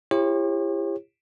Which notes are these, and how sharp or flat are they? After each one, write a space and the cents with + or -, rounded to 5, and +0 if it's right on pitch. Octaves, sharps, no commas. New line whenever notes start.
E4 +35 G4 +35 C#5 -40